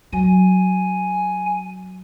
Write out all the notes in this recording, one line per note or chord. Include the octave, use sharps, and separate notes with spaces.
F#3 G#5